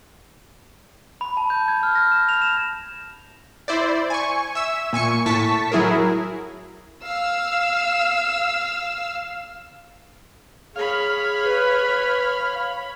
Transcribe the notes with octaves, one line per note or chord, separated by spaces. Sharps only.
B5
A5
G6
G#6
F6
A#6
E7
F7
E7
E4 C5 D5
G#5 C#6
E5 E6
A#2 G#5 C#6 C#7
A2 A5 C#6 B6
F#3 E4 G#4 A#4
F5 E6
G#4 C#5 F5 B5
B4